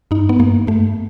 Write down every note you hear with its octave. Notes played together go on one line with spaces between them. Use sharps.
G2 D#4
B3
G2 A#3
G2 A3